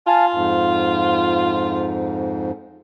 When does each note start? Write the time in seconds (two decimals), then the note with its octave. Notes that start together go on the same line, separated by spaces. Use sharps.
0.07 F4 F5 G#5 A5
0.33 F2 G#2